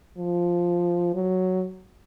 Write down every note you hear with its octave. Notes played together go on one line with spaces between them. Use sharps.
F3
F#3